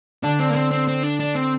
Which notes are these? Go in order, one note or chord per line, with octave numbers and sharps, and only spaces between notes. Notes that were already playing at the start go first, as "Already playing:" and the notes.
D3 D4
C4
A#3
C4
C4
C4
D4
D4
C4